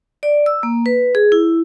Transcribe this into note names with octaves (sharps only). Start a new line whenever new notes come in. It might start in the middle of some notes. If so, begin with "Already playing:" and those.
D5
E6
A#3
B4
G#4
E4